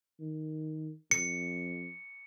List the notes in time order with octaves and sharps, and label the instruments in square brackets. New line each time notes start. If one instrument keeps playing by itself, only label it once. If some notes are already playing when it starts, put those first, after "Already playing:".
[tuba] D#3
[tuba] F2 [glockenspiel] C#7